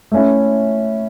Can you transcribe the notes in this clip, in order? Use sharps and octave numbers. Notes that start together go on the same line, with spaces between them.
A3 C#4 E4